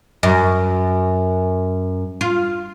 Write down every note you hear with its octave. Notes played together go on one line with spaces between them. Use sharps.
F#2
F4